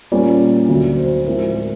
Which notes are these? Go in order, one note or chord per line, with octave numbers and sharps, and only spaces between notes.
A#2 G3 A#3 C#4 D5
D2 D3 F#3
C5
A2 F3 G#3 C4 A#4
A#4